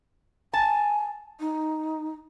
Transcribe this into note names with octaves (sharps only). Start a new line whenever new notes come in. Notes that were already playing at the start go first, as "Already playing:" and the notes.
G#5 A5
D#4